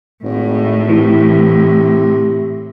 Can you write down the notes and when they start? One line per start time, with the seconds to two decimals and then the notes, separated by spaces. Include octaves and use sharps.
0.24 G#1 A2
0.89 C3 E3